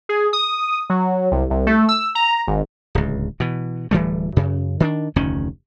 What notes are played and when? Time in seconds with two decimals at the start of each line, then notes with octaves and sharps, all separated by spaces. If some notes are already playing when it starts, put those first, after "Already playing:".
0.09 G#4
0.33 D#6
0.90 F#3
1.32 C2
1.50 C2
1.67 A3
1.89 E6
2.15 A#5
2.48 G#1
2.95 D1 C#2
3.40 B2 E3
3.91 D1 E3 G3 A3
4.36 F#2 C#3
4.80 D#3 C#4 D4
5.16 F1 D2 D#3 C#4